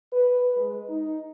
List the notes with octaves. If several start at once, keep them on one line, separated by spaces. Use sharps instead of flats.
B4
G#3
D#4